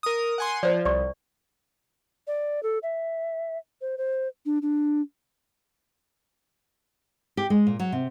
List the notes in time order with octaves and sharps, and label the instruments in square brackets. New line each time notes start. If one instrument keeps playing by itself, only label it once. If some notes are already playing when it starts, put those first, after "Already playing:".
[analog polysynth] A#4 D#6
F#5 G#5 C6
[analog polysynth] F3 [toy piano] C5 D5
[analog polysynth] C2 [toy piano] D5 C#6
[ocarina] D5
A4
E5
C5
C5
D4
D4
[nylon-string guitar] G4
G#3
A#2
F#3
C3